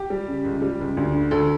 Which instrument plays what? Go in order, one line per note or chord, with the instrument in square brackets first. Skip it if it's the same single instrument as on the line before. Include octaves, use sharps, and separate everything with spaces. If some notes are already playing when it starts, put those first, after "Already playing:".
Already playing: [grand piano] G4
G3
C#3
C#2
G3
C#2
D2
D3
D2 A4